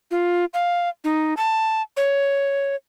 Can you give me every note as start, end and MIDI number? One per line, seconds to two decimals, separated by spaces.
0.11 0.45 65
0.54 0.89 77
1.04 1.34 63
1.37 1.82 81
1.97 2.76 73